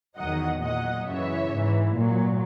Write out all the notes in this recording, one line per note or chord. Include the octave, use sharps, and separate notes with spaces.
E2 D#3 F#3 D#5 F#5
A#2 F#3 D#5 F#5
F#2 C#3 E3 C#5 E5
G#2 E3
A#2 F#3